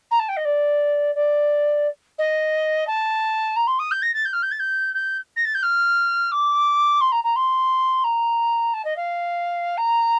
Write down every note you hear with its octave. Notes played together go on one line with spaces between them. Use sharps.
A#5
A5
G5
D#5
D5
D5
D#5
A5
A#5
C6
D#6
G6
A#6
A6
G6
F6
G6
A6
G6
G6
A#6
A6
G6
F6
D6
C6
A#5
A#5
C6
A#5
A5
D#5
F5
A#5